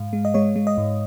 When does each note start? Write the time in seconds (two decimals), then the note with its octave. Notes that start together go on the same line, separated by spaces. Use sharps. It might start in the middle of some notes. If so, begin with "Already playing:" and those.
Already playing: G#2 G#3 F5
0.13 G#3
0.25 D#5
0.34 G#3 C#5
0.56 G#3
0.67 D#5
0.78 G#2